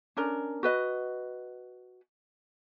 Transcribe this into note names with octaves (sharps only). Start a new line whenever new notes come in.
C#4 D4 A#4
F#4 B4 D#5